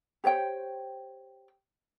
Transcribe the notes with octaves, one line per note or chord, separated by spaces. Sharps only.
G4 C5 C#5 G5